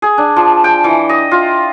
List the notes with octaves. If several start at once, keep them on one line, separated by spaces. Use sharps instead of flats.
G#4
D4
F3
G5
E3
D#5
F4